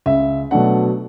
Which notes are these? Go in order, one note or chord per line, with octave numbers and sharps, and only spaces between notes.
C#2 E5
B2 F#3 A3 D4 F#5